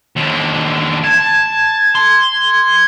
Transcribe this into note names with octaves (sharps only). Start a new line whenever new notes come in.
D#2 D3
A5 G#6
C6